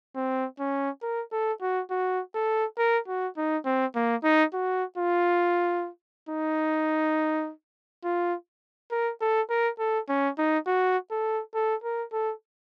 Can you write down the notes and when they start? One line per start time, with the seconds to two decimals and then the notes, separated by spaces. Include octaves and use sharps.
0.16 C4
0.60 C#4
1.02 A#4
1.32 A4
1.61 F#4
1.90 F#4
2.35 A4
2.78 A#4
3.08 F#4
3.37 D#4
3.66 C4
3.96 A#3
4.24 D#4
4.54 F#4
4.98 F4
6.29 D#4
8.04 F4
8.91 A#4
9.21 A4
9.50 A#4
9.79 A4
10.09 C#4
10.38 D#4
10.67 F#4
11.11 A4
11.55 A4
11.84 A#4
12.13 A4